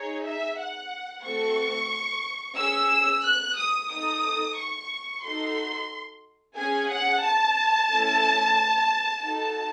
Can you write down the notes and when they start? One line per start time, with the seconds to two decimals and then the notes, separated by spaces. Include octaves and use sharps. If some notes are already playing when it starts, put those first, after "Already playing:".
Already playing: D#4 G#4 C#5
0.24 E5
0.58 F#5
1.24 A3 C4 F#4 A4 C#6
2.57 C#4 G#4 E6
3.24 F#6
3.57 D#6
3.90 D#4 A4 D#6
4.57 C#6
5.24 D#4 F#4 A4 C6
6.56 C#4 G#4 G#5
6.90 F#5
7.24 A5
7.90 A3 C#4 E4 A4
9.23 D#4 F#4 A4 A5